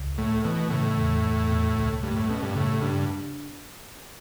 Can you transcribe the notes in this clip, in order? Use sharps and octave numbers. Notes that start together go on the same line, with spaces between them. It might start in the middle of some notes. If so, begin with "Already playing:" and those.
Already playing: C#2
A2 A3
B2 E3
A2 C#3
E2
E2
B2
C#2
G2 A3
A2
B2 C#4
G2
A2 C#3
G2 D4